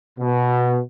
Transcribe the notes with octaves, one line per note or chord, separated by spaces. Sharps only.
B2